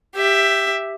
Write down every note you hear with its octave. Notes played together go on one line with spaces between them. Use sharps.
G4 E5